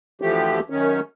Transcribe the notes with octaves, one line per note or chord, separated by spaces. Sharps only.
D2 E3 F3 A3 G4
F#2 D#3 C#4